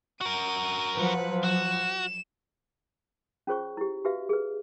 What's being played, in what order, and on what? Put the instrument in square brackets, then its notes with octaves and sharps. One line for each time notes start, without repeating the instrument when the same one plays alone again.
[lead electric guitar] F#4 A#4 [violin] D#7
[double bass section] F3 F#3 [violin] B4 F#5
[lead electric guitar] F#4 [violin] E7
[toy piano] C#4 F4 G#4 C5 C#5 C#6
E4 G4
F#4 G4 B4 E5 F5
G#4 B4